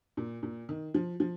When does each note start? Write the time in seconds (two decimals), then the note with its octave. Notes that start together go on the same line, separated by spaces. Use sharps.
0.17 A#2
0.43 A#2
0.69 D#3
0.95 F3
1.20 F3